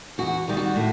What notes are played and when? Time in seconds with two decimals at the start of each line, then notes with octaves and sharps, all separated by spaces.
0.18 E2 F#4
0.48 D#3 G3
0.57 F#4
0.76 A2